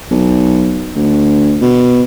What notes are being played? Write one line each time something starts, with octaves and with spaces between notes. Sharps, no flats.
B1
D2
B2